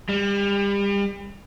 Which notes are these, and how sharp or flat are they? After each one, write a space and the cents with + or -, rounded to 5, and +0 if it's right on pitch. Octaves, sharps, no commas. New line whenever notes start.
G3 +35